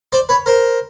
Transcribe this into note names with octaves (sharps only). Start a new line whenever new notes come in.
C5 D5
B4 C#5
A#4 C5